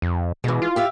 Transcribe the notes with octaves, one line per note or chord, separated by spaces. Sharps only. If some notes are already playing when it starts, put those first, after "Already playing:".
F2
B2 E3 G#3
F4
G4 E5 F5